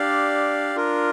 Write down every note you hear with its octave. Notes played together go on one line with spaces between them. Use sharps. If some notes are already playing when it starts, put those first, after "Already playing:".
Already playing: D4 G4 D5 F5
D4 F4 A#4